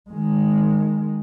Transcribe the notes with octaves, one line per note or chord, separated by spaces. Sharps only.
D#3 G#3